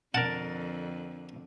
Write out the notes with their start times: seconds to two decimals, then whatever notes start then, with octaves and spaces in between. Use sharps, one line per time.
0.14 F2 D3 A#4 D5 F#5 A5